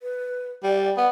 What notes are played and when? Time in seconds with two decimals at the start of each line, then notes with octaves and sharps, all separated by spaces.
0.03 B4
0.63 G3 D5
0.97 B3